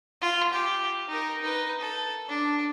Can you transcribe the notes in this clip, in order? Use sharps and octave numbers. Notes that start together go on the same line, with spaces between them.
F4
G4
D#4 A#4
D#4 B4
A4
D4